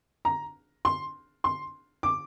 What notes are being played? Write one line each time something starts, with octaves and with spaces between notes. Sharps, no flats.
A#5
C6
C6
D6